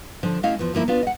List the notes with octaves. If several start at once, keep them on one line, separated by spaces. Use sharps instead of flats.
D3 F3 D4
A3 C#4 E4 D#5 F5
E2 F3
D2 F3 A#3 E4
B3 D4 F4
D#5 F#5